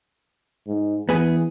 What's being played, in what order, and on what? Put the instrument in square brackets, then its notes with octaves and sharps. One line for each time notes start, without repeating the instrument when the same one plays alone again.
[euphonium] G#2
[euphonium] E3 [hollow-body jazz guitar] B3 G#4